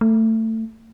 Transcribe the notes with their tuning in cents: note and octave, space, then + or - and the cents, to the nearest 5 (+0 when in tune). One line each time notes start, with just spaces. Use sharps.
A3 +20